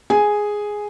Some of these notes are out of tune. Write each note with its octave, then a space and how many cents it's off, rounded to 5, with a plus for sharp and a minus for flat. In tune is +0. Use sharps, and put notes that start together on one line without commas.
G#4 +0 G#5 +0